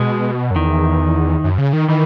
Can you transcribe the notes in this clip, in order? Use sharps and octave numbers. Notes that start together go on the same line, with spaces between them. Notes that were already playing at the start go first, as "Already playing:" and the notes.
Already playing: B2 G#3
F#2
E2 D#3
F#2
C#3
D#3
D#3 E3